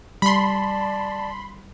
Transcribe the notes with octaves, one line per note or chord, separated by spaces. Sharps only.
G3 D5 A5 B5 C6